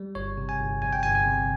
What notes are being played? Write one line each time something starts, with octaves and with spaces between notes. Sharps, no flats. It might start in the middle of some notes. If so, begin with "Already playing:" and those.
Already playing: G3
G1 C#5
C3
G#5
G1
F2 G#5
G5
G1 G#5
G#5
C3